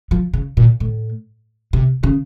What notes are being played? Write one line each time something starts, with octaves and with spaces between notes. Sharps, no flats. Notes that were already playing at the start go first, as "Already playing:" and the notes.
F3
C#3
A#2
A2
C3
C#3